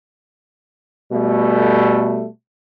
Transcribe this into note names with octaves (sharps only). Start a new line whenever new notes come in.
B2 G3 A3